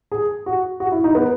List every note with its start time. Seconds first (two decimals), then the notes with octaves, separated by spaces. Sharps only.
0.12 G#4
0.46 F#4
0.80 F#4
0.92 E4
1.04 D#4
1.15 B3